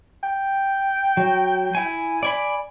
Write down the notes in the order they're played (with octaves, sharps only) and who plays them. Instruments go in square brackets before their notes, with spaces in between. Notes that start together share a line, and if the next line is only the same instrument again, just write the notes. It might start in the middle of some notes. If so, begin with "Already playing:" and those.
[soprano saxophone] G5
[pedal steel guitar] F#3
E4 G#5
D5 G#5 B5